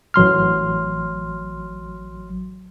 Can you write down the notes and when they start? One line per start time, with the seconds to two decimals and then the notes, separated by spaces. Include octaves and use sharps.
0.14 A1 F#3 C6 F6